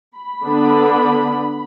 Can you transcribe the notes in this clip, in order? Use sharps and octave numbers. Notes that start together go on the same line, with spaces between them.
B5
D3 B3 D4